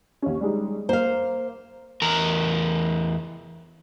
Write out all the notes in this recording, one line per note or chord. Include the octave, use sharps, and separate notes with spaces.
D#2 C#4
G3 G#3 D#4
A#3 C5 F5
E2 A#4 A#5